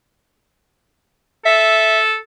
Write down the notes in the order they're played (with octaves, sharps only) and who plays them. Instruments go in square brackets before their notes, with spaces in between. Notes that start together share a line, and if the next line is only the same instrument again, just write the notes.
[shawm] A4 [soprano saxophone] E5